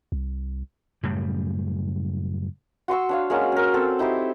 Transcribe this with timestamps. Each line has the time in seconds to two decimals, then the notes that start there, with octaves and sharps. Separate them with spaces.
0.12 C2
1.03 F#2 A2 C#3 G3
2.88 F#4 C6 C#6 E6
3.09 D4 C#5 F5
3.30 G#3 A#3 C#4 F#4
3.52 C#4 A#4
3.74 C4 A4
3.99 D#4 E4 G4 C5